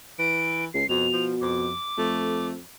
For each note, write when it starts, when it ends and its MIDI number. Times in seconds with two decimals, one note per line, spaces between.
0.19 0.67 52
0.19 0.65 98
0.74 0.84 37
0.74 0.87 96
0.89 1.08 41
0.89 1.68 47
0.89 1.24 101
1.13 1.35 53
1.41 1.76 41
1.41 2.46 86
1.98 2.58 41
1.98 2.52 57